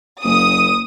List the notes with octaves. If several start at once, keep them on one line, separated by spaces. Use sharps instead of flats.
F#1 D#6